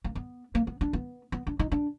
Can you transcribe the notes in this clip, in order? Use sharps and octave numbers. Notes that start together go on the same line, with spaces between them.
A#3
B3
A#3
B3
D4
B3
B3
D4
D#4
D4